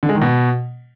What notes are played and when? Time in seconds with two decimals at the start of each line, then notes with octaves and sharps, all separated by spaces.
0.03 D3
0.09 G#3
0.15 D#3
0.21 B2